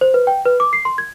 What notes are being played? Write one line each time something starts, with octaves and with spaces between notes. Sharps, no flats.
C5
B4
G5
B4
D6
C7
C6
G#6